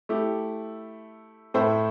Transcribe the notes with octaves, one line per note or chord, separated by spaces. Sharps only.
A3 E4 G4
A2 A3 E4 C5 E5